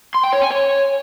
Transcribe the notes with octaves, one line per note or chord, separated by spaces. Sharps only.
C6
G5
C#5
G#5
C#5